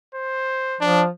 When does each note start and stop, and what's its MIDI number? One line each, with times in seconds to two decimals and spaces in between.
0.15 0.80 72
0.81 1.08 53
0.81 1.03 62